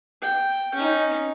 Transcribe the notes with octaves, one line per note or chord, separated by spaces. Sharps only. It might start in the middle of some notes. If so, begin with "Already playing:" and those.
G5
C#4 D#4